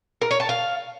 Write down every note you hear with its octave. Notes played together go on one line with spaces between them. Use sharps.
A#4
C#5
A5
F5